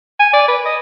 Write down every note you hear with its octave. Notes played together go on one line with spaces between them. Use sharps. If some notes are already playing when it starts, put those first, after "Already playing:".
G#5
D5
B4
D#5